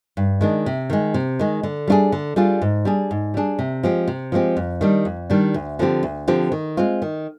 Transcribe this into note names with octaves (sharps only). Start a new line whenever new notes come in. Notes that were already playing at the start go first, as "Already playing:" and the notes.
G2
D#3 G#3 D4
C3
D#3 G#3
C3
D#3 G#3
D3
G3 D4 F4 G#4
D3
G3 D4 F4 G#4
G#2
G3 D4 G#4
G#2
G3 D4 G#4
C3
F3 G#3 C4 G4
C3
F3 G#3 C4 G4
F2
D#3 G3 D4
F2
D#3 G3 D4
D2
D3 F3 C4 G4
D2
D3 F3 C4 G4
D#3
G#3 C4 F4
D#3